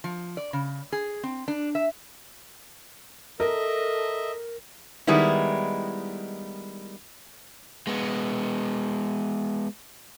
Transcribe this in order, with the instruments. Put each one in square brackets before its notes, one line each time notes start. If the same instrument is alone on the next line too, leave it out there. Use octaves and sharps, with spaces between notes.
[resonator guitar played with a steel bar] F3
D5
C#3
G#4
C4
D4
E5
[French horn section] A4 [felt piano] A#4 [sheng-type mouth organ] D#5 E5
[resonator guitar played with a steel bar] D#3 G3 G#3 B3 E4
[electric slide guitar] G#3 B3